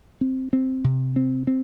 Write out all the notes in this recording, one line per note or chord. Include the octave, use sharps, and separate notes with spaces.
C4
C4
C3
C4
C4